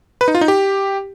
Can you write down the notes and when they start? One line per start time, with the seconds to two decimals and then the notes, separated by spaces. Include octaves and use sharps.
0.21 B4
0.28 D#4
0.35 F4
0.41 D#4
0.48 G4